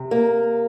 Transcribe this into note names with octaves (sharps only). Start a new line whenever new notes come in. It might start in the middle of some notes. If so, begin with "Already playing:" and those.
Already playing: C3
A#3